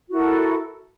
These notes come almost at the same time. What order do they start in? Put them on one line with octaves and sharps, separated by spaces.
F#4 E4 A#4 A4